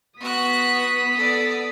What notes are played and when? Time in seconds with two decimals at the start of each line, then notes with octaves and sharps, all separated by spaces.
0.20 B3 F#4 D#6 F#6 B6
1.14 A4 D5